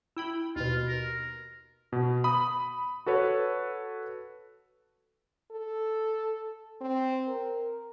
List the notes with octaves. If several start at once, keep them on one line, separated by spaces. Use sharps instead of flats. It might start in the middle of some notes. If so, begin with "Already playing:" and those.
E4 G5 B5
D#2 B2 F4
A#4
B2
B5 D#6
F#4 A4 B4 C#5
A4
C4
A#4